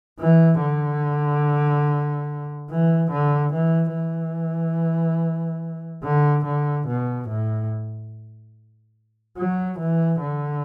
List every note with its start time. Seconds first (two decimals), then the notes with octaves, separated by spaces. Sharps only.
0.20 E3
0.61 D3
2.70 E3
3.11 D3
3.53 E3
3.94 E3
6.04 D3
6.45 D3
6.88 B2
7.28 A2
9.37 F#3
9.79 E3
10.21 D3